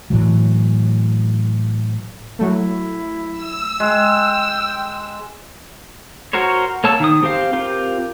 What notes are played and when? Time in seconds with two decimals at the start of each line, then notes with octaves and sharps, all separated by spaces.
0.10 A2 E3 F#3
2.39 F#3 A3 E4
3.31 E6
3.80 G#3 G5
6.33 F#4 A#4 C5 C#5
6.84 A#3 C#5 A5 E6
7.00 D#3 D#6
7.22 C4 G4 C5 F5
7.53 C4 F4 G4 A#4